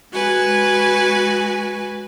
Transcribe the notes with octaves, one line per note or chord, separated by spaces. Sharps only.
G#3 F#4 B4 G#5